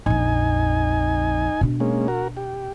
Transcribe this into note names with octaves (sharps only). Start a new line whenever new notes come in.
A#1 F2 D#4 G#5
B2 D4
G#3 A#3 C#4
F#4 A#4
G4